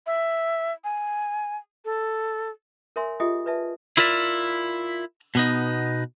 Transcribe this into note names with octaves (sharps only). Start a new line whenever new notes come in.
E5
G#5
A4
A#4 C#5 E5 G#5 C6 E6
F4 G4 G#4 D#5 E5 D#6
B4 D5 E5 A5
E4 F4 A#4 D5 E5
B2 B3 D#4